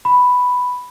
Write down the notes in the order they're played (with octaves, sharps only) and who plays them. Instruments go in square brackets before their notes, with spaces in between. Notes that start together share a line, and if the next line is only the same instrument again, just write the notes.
[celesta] B5